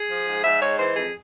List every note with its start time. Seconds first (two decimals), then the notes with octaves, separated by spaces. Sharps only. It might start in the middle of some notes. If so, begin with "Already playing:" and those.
Already playing: G#4
0.09 F3
0.27 G#2
0.44 G#2 E5
0.61 G#3 C#5
0.79 E3 C5
0.96 F2 G#4